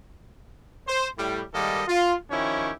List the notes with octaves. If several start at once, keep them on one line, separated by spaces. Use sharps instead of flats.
C5
A2 G3
G#2 D#3 G3 A#3 A4 D#5
F4
D#3 F3 C#4 E4 G4 C#5